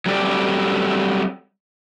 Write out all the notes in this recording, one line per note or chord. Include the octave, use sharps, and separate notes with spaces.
F#3 G3 A3 C4 A4 D5